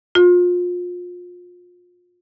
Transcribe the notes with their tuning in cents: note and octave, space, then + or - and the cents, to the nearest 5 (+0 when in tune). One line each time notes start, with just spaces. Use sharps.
F4 +30